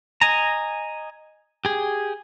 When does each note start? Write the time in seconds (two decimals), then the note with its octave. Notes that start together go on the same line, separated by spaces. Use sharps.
0.21 D#5 G#5 A#5
1.65 G4 G#4